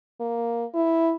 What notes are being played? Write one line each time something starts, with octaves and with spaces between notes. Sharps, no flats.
A#3
E4